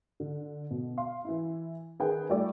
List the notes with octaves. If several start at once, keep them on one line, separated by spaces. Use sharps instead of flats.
D3
B2
F5 C6
E3 E4
D#3 G#4 A#4 B4 G5
G3 A3 F4 G4 D5